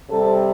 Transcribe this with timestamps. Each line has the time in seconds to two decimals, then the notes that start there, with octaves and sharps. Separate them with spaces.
0.10 C3 G3 C4 A4